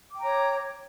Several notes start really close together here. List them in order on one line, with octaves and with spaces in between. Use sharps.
D6 G5 A#5 C#5